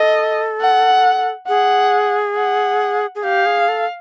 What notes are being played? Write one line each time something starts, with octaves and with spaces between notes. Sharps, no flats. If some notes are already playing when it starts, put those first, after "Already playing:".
Already playing: A4 D#5
F#5
G#4 F#5
F#5
G#4
G4 F5
G#4
A4